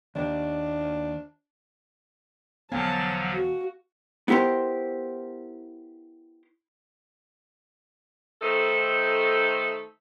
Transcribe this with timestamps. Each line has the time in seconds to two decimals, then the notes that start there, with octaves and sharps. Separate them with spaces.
0.16 D#2 D4
2.72 E1 D3 F3 F#3 B3 F5 G#5 A5
3.32 F#4
4.28 B3 E4 G4 A#4 C5
8.42 D#3 A3 D#4 A4 C5